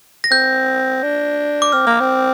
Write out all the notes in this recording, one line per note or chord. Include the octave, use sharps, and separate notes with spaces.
A#6
C4 G6
D4
D6
C4 F6
A#3
C4